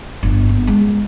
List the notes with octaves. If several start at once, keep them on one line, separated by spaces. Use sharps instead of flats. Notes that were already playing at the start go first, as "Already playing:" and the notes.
G1
B3
G#3